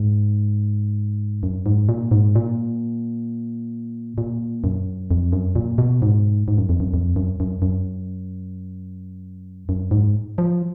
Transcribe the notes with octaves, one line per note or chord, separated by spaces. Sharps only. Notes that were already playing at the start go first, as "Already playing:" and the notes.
Already playing: G#2
F#2
G#2
A#2
G#2
A#2
A#2
F#2
F2
F#2
A#2
B2
G#2
G#2
F#2
F2
F#2
F2
F#2
F#2
F#2
F#2
G#2
F3